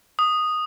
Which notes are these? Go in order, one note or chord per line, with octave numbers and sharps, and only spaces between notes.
D#6